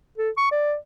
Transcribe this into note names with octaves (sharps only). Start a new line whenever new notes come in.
A4
C#6
D5